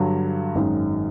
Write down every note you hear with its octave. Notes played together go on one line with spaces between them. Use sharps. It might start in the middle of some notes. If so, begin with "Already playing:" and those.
Already playing: G2 D3 F#3
G#1 F#2 D#3 G#3